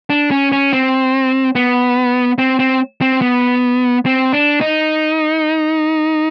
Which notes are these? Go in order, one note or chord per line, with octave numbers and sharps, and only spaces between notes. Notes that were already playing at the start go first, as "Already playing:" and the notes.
D4
C#4
C#4
C4
B3
C4
C4
C4
B3
C4
D4
D#4